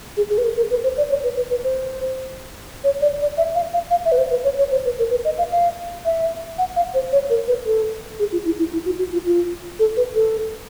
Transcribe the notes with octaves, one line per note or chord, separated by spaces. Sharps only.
G#4
G#4
B4
A#4
A#4
B4
C5
D5
C#5
B4
B4
B4
C5
C#5
D5
D5
E5
F5
F5
F5
E5
B4
C5
B4
C#5
C#5
C5
B4
A#4
B4
D#5
F5
F5
E5
F#5
F5
C5
C#5
A#4
B4
A4
G#4
F4
E4
E4
E4
F#4
F#4
F4
F4
A4
B4
A4